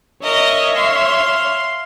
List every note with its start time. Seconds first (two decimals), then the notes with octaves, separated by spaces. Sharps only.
0.23 A#4 C#5 D#5 E5
0.76 F5 C6